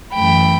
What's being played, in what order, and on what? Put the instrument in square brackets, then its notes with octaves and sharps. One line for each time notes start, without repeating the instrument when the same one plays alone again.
[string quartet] F#2 E3 A3 G5 B5